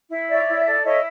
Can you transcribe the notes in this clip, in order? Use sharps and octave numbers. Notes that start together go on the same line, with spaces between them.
E4
C#5 D5 E5
E4
A4 D5
E4 C#5 D#5